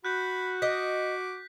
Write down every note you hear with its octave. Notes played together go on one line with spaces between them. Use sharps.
F#4 B5 F#6 G6
D#5 D6 B6